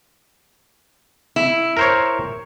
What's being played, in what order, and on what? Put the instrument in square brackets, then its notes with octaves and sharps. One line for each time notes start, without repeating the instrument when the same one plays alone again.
[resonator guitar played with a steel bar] E4
[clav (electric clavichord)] A#4 C5 C#5